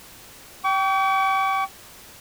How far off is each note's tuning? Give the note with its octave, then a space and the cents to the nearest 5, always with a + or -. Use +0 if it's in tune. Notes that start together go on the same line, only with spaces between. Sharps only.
G5 -20 C#6 +45